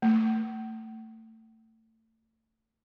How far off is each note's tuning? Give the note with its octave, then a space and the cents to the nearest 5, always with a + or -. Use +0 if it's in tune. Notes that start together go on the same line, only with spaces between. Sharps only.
A3 +25